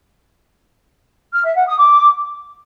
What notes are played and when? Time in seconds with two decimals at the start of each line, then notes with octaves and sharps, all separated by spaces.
1.33 F6
1.44 E5
1.56 F#5
1.67 D#6
1.78 D6